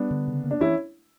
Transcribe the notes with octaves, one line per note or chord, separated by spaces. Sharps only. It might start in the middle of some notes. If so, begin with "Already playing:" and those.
Already playing: G3 B3 D4
D3
C#3
A#3
D4
E3 C#4 E4